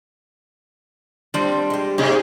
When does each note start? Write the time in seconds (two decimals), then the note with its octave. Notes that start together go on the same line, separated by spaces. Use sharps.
1.34 F3 G3 C4 D4 C5
1.70 G#3 G4
1.98 G#2 C3 D#4 G4 G#4